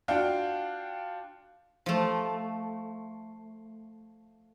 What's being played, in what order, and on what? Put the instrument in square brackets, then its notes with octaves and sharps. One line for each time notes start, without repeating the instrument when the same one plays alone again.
[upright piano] D4 F4 F#4 F5 G5
[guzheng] F3 A3